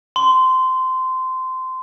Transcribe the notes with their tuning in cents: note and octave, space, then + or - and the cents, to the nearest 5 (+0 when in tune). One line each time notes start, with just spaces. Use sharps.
C6 -20